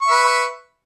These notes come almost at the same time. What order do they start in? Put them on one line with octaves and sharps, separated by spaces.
C#6 E5 B4